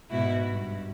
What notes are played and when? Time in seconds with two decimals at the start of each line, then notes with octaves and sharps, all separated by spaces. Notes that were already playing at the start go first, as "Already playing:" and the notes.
0.10 G#2 B2 E4 F#4
0.46 G2